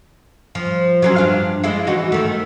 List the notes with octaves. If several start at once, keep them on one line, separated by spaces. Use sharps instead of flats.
F3
F#3 C4 C#4
G2 D4 F5
G#3 E4 F4
E3 D#4 F#4
D#3 A3